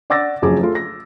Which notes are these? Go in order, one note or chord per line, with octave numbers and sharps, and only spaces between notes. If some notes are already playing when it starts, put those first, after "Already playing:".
D5 F#5 D6 E6 A6 A#6
F#1 F2 F#3 G#4 D6
A3 F4
A#6